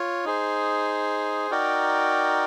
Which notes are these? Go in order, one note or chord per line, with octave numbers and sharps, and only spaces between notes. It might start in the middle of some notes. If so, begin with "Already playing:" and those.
Already playing: F4 C#5
D#4 G#4 C5
D#4 F#4 A#4 D5 G5